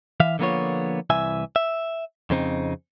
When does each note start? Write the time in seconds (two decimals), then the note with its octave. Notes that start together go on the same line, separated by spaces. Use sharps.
0.20 E3 E5 F5
0.39 D3 F3 A#3 B3 F4 C#5
1.10 C2 E3 E5 G#5
1.56 E5
2.30 F2 C#3 C4 D#4